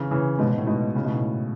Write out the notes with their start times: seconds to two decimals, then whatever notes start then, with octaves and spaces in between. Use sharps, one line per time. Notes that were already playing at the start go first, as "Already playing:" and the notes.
Already playing: C#3 E3
0.11 C#3 E3
0.39 G#2 B2
0.49 G#2
0.58 A2
0.67 G#2 B2
0.95 A2 C#3
1.04 G#2 B2
1.14 A2